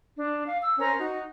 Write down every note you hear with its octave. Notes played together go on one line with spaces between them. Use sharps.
D4
F5
E6
C#4 A#4 C5 A#5
D#4 F#4